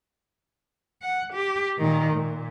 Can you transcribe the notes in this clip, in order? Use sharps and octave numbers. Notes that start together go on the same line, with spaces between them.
F#5
G4
A#2 D#3
A#2